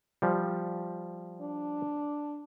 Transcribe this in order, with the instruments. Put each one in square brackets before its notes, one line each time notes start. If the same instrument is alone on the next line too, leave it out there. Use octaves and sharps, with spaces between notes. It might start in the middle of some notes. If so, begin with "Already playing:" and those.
[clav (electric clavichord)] F3 G3
[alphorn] D4